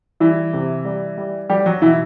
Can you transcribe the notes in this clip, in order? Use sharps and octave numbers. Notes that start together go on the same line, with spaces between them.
E3 G3 E4
C3
G3
G3
F#3 G3 G4
F#3 F#4
B2 E3 E4